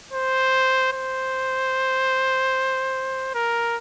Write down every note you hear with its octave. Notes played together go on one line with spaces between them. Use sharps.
C5
C5
A#4